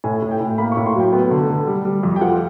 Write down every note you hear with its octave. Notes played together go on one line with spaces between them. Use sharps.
A2 G#5
A2
G5
A2
A#3 B5
C#6
A2
C6
F#3 G5
B3
D3
D3
G3
G3
F2
G5
F3 F#5